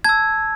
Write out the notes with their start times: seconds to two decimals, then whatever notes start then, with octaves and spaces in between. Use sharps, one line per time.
0.04 A5 E6 G#6